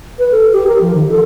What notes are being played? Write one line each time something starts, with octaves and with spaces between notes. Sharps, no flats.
B4
A4
G4
A#4
F3
D#3
A4